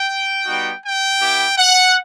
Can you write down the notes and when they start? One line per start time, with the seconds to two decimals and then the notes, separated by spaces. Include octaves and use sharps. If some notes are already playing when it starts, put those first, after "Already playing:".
Already playing: G5
0.45 G3 B3 D#4 F#4
0.83 G5
1.20 B3 E4 G4
1.57 F#5